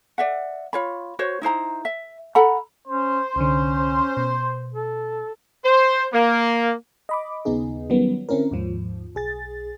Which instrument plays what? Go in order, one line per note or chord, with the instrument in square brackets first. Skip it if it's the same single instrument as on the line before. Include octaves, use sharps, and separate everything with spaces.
[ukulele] D5 E5 F#5
F4 C#5 B5
F#4 C5 C#5
D#4 E4 C5 A#5
E5
A4 F#5 A#5 B5
[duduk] C#4 [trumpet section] C5
[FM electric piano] C2 D3 [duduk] C#4
[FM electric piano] B2
[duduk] A4
[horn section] C5
A#3
[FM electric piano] D#5 B5 D6
D#2 C#3 B3 D#4 G#4
D#3 F#3 G3 B3 C#4
D3 C4 C#4 E4 A#4
D#2 G#2 F3
B1 G#4 A6